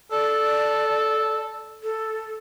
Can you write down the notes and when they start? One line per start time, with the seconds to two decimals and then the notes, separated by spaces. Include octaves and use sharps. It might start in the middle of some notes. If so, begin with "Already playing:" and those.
0.12 A4 D5
1.83 A4